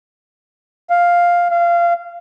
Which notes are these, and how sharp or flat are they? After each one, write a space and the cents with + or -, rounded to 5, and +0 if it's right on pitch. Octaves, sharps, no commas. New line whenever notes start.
F5 +5
F5 -20